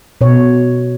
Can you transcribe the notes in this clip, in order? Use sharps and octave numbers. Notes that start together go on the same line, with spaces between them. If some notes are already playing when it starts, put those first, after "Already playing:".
B2 C#5